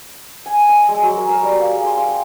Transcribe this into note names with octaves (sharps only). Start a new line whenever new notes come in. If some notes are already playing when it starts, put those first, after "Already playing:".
G#5
D#5
G#3
F#3
A#4
A#4
G3
F5
G#4
C6
F5
G5